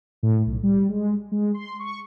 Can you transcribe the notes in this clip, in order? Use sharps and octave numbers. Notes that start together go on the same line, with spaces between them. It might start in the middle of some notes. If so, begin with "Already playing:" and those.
A2
B1
G3
G#3
G#3
C6
C#6